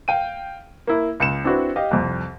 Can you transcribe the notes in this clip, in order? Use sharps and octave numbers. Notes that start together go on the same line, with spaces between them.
F5 G5 D#7
A#3 E4
C#2 C#7 E7
C4 D4 E4 F#4 B4
G4 D#5 F5
C2 F2